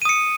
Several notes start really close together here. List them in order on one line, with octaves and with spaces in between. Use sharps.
D#7 D#6 C#7